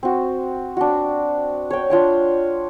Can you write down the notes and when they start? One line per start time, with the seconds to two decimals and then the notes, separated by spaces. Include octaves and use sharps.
0.03 C4 F#4
0.77 D4 F#4
1.70 C#5 G5
1.90 D4 F4 C#5 G5